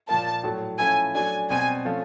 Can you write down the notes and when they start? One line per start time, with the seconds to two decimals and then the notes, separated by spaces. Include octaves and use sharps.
0.09 A#2 F3 A#3 A5
0.43 A2 F#3 A3
0.79 F3 A3 C#4 E4 A4 G#5
1.15 F#3 A3 D4 G#5
1.50 B2 G3 C4 G#5
1.85 F3 A3 C#4 F4